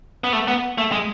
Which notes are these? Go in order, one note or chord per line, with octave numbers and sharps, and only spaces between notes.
B3
A3
B3
A3
G#3